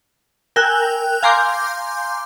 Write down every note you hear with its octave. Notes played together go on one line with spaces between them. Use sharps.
A#4 G5 G#5 E6 F#6
F5 G#5 A#5 C6 D6 G6